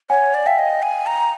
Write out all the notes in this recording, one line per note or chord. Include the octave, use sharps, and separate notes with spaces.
C#5 F#5 G#5
D5
E5 F5 G5
D#5
G#5
A#5